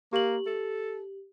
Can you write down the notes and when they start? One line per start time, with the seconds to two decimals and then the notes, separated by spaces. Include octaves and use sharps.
0.13 A#3 G4 F#7
0.46 A4